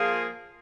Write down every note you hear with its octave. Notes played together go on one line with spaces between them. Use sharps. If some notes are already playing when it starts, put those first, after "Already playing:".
Already playing: F3 A#3 F4 G#4